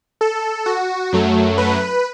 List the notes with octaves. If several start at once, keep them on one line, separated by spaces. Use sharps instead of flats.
A4
F#4
F#2 F#3 A3
B4